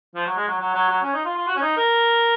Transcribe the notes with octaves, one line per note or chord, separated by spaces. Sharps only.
F3
F#3
G#3
F#3
F#3
F#3
F#3
C#4
D#4
F4
F4
F#4
C#4
D#4
A#4